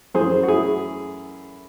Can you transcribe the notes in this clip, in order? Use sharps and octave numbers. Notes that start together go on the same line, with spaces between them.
F#2 E3 A3 G#4 C5
F#4
E4 G#4